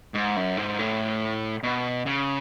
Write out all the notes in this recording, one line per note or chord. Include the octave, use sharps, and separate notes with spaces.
G#2
F#2
G#2
A2
B2
C#3